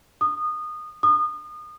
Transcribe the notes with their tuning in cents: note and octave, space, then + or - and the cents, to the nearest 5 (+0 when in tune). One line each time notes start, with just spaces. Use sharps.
D#6 -20
D#6 -30